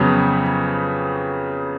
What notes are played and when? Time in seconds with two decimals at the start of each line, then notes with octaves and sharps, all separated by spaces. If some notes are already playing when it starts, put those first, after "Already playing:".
Already playing: F2 C#3 F#3 B3 C#5